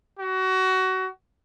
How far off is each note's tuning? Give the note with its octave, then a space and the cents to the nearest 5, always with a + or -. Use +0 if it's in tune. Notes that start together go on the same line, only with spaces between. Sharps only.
F#4 +25